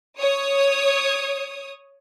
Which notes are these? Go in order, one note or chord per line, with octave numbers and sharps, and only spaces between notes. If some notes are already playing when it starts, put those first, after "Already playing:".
C#5 D#6